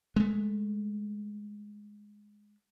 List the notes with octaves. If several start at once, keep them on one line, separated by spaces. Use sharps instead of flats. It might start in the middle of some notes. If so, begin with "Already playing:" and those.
G#3 A3